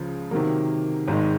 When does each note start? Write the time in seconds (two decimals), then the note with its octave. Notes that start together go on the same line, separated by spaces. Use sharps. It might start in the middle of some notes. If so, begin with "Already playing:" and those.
Already playing: C#2 C#3 F3
0.31 C3 D#3 F#3 A#3
1.08 G#1 G#2 D#3 G#3